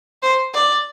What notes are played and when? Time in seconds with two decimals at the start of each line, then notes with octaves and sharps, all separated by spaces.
0.22 C5
0.54 D5